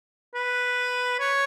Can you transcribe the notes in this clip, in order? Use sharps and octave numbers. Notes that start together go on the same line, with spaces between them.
B4
C#5